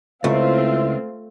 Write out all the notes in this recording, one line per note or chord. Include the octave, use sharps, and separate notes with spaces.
C#2 A3 C4 E4 F4 E5